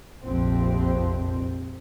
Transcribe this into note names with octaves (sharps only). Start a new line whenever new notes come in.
F1 A#1 F2 C4